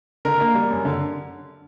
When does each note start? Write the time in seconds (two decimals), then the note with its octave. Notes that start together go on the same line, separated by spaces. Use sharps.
0.25 D3 A#4
0.40 A#3
0.55 G3
0.71 F#2
0.85 D3